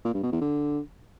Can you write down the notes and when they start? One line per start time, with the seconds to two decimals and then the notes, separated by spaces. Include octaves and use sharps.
0.05 A#2
0.14 G2
0.23 B2
0.32 E2
0.41 D3